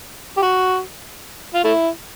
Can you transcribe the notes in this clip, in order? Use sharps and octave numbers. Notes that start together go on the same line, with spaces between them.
G4
F#4
F4
A3 E4